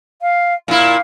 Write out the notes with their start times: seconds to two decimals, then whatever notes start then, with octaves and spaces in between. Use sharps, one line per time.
0.21 F5
0.68 A#2 E4 F5